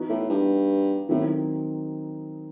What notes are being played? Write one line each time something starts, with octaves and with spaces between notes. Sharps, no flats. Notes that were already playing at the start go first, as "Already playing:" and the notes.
Already playing: E3 B3 D#4 F#4
A2
G2
A2 D#3 F#3 C4 D#4 F#4